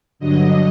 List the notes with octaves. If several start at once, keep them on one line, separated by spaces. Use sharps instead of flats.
G2 D3 F#3 D#5